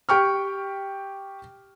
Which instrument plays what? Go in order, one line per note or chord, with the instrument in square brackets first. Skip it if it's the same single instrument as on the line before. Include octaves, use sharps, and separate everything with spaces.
[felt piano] G4 G5 C#6 F6